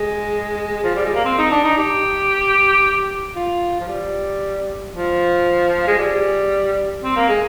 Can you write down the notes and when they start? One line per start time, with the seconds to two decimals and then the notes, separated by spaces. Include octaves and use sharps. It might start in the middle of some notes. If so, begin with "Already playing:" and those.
Already playing: G#3
0.84 F3
0.95 G3
1.05 G#3
1.15 A#3
1.25 C4
1.38 D#4
1.51 D4
1.64 D#4
1.78 G4
3.36 F4
3.80 F3
3.88 G3
4.93 F3
5.87 G#3
5.98 G3
7.03 C4
7.16 A#3
7.29 G#3